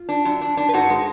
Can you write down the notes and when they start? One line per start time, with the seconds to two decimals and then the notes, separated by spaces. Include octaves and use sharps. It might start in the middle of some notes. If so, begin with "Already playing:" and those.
Already playing: F4
0.09 D4
0.25 F#2
0.41 D4
0.57 D4
0.69 B4
0.73 G#2 F#4 A4
0.90 G#3